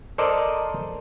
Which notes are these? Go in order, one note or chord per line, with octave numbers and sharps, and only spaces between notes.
A4 A#4 C5 D5 D#5